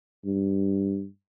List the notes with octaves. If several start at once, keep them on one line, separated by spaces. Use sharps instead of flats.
G2